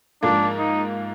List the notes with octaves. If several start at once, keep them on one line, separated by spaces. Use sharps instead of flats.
G#2 F3 A#3 D4
D#4